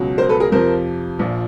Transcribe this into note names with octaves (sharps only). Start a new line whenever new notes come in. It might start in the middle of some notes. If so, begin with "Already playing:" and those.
Already playing: C#2 B2 F#3
A#4 C5
A4 B4
G#4 A#4
F2 C3 F3 A#4 C5
A#1 A#2 F3